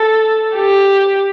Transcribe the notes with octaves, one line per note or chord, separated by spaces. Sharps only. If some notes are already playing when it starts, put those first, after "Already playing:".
Already playing: A4
G4